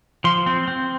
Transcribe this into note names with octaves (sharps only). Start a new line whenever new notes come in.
F3 C6
C4
C4